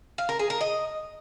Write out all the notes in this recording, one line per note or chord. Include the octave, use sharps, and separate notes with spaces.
F5
A#4
G#4
A#4
D#5